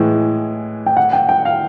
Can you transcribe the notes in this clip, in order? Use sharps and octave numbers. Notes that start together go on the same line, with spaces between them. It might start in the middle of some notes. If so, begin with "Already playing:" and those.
Already playing: A2 E3 G#3
G5
F#5
G5
G5
F5